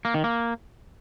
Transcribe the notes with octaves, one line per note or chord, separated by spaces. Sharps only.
A#3
D#3
A#3